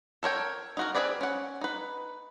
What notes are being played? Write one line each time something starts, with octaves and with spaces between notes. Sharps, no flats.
A4 A#4 C#5 G5
D#4 F#4 A#4
C4 F#4 G#4 B4 D5
C#4 F#5
D#4 B4